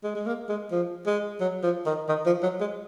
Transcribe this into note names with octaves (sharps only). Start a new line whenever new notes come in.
G#3
G#3
A#3
G#3
F3
G#3
F#3
F3
D#3
D#3
F3
F#3
G#3